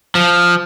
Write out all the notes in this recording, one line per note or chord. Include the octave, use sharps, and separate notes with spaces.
F3